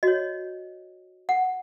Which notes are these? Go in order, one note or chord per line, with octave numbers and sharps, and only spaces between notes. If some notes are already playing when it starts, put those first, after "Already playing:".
F#4 C#5 D#5
F#5